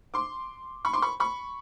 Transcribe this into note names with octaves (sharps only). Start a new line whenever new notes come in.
C6 D6
B5 C#6
C6 D6
B5 C#6
B5 C#6